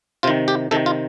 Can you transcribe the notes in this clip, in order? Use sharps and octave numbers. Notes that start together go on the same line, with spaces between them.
C3 D#3 F4
G4
C3 D#3 A4
F4